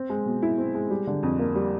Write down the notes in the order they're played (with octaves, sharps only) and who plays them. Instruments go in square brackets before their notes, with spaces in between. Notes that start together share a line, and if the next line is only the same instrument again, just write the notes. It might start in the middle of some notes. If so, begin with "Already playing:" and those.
Already playing: [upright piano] C4
G#3
B2
E4
C4
G#3
G3
D3
F2
A#3
G3